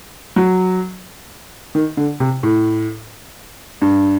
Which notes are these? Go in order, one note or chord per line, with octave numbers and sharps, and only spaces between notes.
F#3
D#3
D3
C3
A2
G2